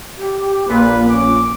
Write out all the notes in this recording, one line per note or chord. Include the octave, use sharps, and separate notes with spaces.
G4
A#1 A#2 A#3 B4
C#4 D6